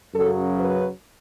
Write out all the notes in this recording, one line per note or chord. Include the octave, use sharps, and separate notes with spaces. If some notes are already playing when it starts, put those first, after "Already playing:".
F#2 C#3 F#3 A4
B4